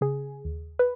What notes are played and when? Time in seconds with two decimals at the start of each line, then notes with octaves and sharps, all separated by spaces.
0.01 C#3 G#4
0.45 D#2
0.79 B4